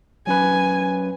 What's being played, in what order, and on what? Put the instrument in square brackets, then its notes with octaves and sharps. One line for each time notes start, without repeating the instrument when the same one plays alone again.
[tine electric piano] F#3 C#4 B4 [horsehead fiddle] G#5